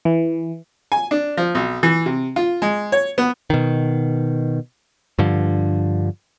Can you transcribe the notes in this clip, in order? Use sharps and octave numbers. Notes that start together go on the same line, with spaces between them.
E3
G#5
D4
F3
B1
E3
C3
F4
G#3
C#5
B3
B2 D#3
G2 D3 F3